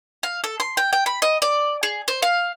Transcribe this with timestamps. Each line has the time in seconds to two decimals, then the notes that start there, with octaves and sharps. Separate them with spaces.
0.23 F5
0.44 A4
0.60 C6
0.77 G5
0.93 G5
1.06 B5
1.22 D#5
1.42 D5
1.83 G#4
2.08 C5
2.22 F5